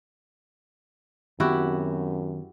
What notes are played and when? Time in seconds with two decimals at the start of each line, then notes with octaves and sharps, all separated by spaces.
1.40 F#2 D#3 B3 C4 E4 F#4 G4